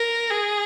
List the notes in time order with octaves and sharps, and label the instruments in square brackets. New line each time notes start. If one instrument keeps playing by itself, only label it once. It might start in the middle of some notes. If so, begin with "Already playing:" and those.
Already playing: [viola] A#4
G#4